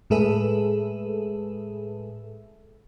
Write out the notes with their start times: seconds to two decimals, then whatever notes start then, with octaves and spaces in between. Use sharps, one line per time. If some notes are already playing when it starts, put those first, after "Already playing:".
0.10 A2 G#3 G#4 A4 B4 E5